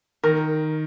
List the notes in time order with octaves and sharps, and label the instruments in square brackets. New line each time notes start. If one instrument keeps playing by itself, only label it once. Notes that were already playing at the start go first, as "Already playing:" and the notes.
[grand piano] D#3 [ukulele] A#4